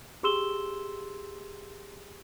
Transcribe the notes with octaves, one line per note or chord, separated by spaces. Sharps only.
G4 G#4 C6 E6 E7 G7